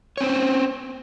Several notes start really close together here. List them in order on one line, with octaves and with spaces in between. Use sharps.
C#5 C4 C5 C#4